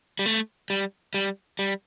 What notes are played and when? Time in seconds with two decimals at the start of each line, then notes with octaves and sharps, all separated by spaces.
0.19 G3
0.26 A3
0.70 G3
1.14 G3
1.59 G3